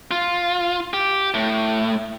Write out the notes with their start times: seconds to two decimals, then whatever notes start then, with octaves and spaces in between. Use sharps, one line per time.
0.11 F4
0.93 G4
1.34 A2